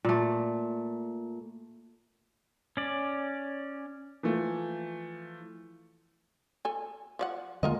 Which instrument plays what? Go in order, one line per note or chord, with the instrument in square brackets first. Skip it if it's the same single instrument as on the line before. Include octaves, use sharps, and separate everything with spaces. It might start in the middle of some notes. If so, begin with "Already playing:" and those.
[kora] A#2 A3
[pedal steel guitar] C#4 D5
[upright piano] E3 F3 A3
[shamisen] A4 G#5
F3 D5 F#5
[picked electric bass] D3 G#3 A#3 [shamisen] F4 A#4 D#5